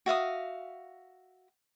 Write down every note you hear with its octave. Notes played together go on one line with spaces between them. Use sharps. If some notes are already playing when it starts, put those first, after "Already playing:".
F#4 E5 F5 D#6